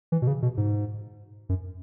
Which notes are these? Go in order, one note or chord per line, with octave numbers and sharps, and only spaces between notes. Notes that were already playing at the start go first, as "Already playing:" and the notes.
E3
B2
C#3
B2
G#2
F#2